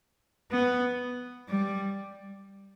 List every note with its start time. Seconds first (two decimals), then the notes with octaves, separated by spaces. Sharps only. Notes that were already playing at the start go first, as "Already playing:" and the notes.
0.51 B3
1.49 G3